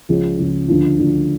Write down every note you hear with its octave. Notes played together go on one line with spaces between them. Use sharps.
C#2 C#3 F3
C#2 C#3 F3
D2 D3 F3
D2 D3 F3